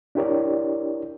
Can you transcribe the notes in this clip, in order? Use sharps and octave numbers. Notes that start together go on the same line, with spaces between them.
D4 E4 G4 A#4 C#5 D5